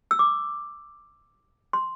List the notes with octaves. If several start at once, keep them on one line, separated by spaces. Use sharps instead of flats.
E6
D6
C6